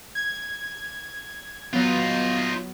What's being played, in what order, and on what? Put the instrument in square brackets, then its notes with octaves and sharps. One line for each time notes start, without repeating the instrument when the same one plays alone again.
[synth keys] G#6
[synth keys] F#3 B3 [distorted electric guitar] D#4 F4